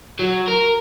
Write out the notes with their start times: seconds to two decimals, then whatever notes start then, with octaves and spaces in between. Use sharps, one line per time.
0.19 F#3
0.47 A#4